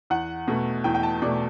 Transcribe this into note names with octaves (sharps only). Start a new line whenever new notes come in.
E2 F#5
B2 A3
E2 G5
G5
A5
B2 A3 D5